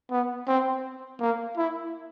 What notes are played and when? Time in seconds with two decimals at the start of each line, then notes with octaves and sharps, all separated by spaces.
0.11 B3
0.47 C4
1.20 A#3
1.57 E4